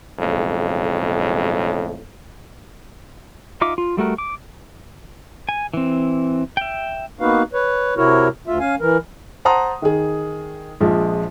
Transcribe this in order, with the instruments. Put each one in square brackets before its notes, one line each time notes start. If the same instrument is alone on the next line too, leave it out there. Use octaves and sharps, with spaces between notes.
[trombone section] B1 F2 A2 C#3 G#3
[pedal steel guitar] D#4 F4 E5 D6
F4
G3 A3 F#4 A#4
D6
G#5
E3 C4
E5 G5
[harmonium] A#3 B3 D#4 F#4 B4 F5
B4 C#5
C3 E4 F#4 A#4 C#5
D2 F4 E5
C#4 F5 G#5
E3 A#4
[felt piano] C5 F#5 A5 A#5 C6 D#6
D#3 G#4
A#1 F3 G#3